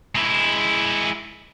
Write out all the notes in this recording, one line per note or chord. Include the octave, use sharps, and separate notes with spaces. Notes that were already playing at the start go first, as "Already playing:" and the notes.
G#3 E4